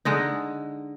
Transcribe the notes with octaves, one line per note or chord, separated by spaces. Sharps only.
D3 G#3 D#4